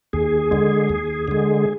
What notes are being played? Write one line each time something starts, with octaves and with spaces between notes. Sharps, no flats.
D#2 G#4
D3 G#3
D#2
D3 G#3